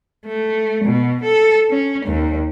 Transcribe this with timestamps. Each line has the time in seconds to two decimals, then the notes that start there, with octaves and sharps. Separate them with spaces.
0.26 A3
0.84 B2
1.24 A4
1.71 C#4
2.06 D#2